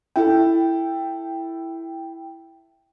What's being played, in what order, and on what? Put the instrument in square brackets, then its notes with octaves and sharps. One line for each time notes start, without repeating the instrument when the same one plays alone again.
[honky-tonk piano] E4 A4 [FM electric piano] G5